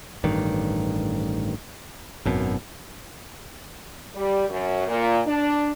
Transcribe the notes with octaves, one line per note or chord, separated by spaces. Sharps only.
A1 G2 D#3
G#1 F#2 B2
G3
F#2
A#2
D4